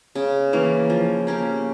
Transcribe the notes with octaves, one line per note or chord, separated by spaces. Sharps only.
C#3
E3 A#3 C#4
F3
A#3 C#4 G4